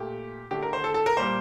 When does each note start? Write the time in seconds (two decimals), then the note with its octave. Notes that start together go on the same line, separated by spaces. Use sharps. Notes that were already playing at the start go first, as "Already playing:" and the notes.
Already playing: A#2 A3 G4
0.51 D3 A3 G4
0.62 A#4
0.73 C5
0.84 A4
0.94 A4
1.06 A#4
1.17 A#2 G3 A#3 C5